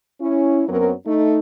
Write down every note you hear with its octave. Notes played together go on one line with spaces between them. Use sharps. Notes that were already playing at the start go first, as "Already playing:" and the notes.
C#4 E4
F#2 F#3 B3 C4 A#4
A3 D#4